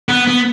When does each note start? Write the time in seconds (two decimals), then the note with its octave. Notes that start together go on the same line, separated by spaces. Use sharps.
0.09 B3
0.27 B3